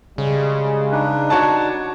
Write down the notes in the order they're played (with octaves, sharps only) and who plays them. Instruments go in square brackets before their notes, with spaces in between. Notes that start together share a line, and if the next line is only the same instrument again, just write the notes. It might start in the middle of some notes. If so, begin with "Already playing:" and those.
[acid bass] C#3 [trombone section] G3 G#3
[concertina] D4 D#4 B4
[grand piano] F#4 C#5 A5